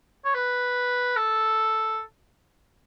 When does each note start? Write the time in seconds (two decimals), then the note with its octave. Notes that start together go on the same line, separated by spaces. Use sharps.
0.25 C#5
0.34 B4
1.16 A4